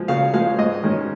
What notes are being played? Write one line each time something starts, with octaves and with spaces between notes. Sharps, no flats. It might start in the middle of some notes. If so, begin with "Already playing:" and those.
Already playing: F3 G#3
C#3 F5
F3 G#3 F5
G#2 D#5
D#3 G#3 C#4